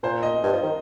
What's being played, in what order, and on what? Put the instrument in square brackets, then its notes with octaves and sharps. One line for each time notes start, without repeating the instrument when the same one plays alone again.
[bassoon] A#2 [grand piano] C5
[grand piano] D#5
[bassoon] G2
F3
D#3